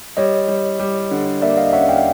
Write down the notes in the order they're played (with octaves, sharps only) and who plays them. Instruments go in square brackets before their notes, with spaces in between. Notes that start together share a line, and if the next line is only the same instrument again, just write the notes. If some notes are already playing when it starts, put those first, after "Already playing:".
[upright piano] G3 [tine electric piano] C#5 D#5
[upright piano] G3
G3
D3
[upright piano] A#3 [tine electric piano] D5 E5
[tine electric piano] D#5 F5
[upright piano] C#4 [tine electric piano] E5 F#5
[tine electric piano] F5 G5